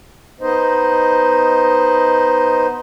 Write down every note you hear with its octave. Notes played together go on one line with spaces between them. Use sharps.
B3 D#4 C5 D#5